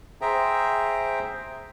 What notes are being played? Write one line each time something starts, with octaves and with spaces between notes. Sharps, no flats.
G#4 C5 E5 G5 A#5